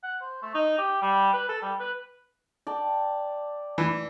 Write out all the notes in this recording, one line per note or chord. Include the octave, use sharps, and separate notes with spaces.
F#5
C5
A3
D#4
G4
G3
B4
A4
G3
B4
D5 G5 A5
E3